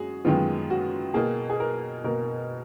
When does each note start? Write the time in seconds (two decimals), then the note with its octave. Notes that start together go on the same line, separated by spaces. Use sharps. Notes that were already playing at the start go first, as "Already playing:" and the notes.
Already playing: F#2 G#3 F#4 G#4
0.25 F#2 D#3 G#3 B3 F4
0.70 F#4
1.14 B2 A#3 G#4
1.50 G#4
1.60 A#4
2.04 B2 A#3 A#4